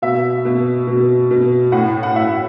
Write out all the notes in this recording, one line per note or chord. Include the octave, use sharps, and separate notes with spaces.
B2 E5
B2
B2
B2
A2 F#5
F#5
A2 E5